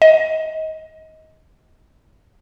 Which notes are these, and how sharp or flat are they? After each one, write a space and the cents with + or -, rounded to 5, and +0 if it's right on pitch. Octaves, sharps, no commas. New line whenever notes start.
D#5 +25